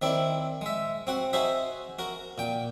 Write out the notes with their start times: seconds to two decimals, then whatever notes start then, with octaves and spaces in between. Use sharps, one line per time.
0.02 D#3 C4 E4 D5
0.61 G#3 E5
1.07 C4 F#4 F#5
1.33 D#4 F#4 G#4 C5 E5
1.99 F#4 A#4
2.38 A#2 G5